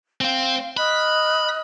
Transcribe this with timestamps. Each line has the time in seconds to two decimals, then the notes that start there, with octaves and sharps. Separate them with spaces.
0.21 C4 C5 F5
0.77 D#5 B5 F6 F#6